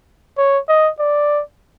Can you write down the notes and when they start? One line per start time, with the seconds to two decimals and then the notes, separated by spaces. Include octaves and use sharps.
0.38 C#5
0.69 D#5
1.00 D5